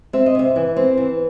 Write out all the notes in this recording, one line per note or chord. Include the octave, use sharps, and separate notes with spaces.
C4 E5
D#5
C3 E5
E3
C4
E3